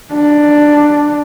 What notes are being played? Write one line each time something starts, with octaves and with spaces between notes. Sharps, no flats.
D4